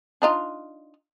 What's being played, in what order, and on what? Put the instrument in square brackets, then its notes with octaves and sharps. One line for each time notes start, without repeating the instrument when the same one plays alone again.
[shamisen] D4 D#4 F4